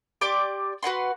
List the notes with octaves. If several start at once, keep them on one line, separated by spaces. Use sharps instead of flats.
G4 D5 C6 D6
F#4 B4 F#5 C6